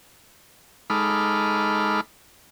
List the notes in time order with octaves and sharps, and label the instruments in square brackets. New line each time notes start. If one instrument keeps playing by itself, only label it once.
[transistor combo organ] G#3 D#4 A4 B5 D6 F6